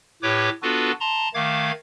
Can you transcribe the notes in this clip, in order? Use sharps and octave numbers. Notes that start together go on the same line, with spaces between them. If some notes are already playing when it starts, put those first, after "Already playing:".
A2 G4 B4 C#5 D6
B3 D4 F4 F#4 A4 B4
A5 A#5 C6
D#3 A3 F5 D6 G#6